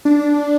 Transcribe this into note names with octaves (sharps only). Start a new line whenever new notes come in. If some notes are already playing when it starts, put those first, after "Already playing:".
D4